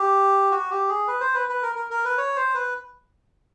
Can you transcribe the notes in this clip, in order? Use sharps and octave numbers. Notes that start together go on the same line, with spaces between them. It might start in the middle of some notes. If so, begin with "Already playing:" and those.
Already playing: G4
F#4
G4
G#4
B4
C5
B4
B4
A#4
A#4
A#4
B4
C#5
C5
B4